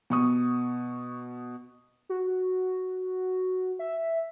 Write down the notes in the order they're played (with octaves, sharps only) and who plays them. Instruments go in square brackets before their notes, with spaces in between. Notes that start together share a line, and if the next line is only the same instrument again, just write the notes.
[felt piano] B2 C#6 D#6
[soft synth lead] F#4
E5